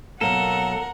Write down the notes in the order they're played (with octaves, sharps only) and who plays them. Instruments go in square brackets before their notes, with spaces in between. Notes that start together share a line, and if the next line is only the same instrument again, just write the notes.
[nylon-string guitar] B2 F#3 A#3 [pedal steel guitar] A4 [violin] A#4 [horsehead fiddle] F#5